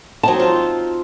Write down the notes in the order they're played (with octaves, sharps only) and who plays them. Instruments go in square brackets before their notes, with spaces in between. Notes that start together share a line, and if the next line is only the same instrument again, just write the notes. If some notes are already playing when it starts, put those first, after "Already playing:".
[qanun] F#3 C4 D#4 [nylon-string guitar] A5
[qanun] F4